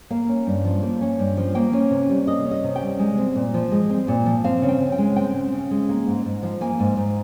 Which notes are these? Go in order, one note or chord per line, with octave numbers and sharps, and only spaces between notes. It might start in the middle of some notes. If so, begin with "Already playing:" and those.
A#3 F5
C#4
G2
F3
A#3
C#4
G2
F3
A#3 G5
C#4
C3
G3
A#3 D#5
C#4
D#5
C3
G5
G3
G#3
C4
A#2
F3
G#3
C4
A#2
F3
C4 F5
C#3
G5
C#3
G5
G#3
C4 G5
C#3
C#3
G#3
A#3
G#2
G#2
F3
A#3 G#5
G#2
G#2